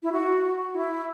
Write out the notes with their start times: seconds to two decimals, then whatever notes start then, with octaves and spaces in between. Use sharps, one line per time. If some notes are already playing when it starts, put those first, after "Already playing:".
0.03 E4
0.12 F#4
0.75 E4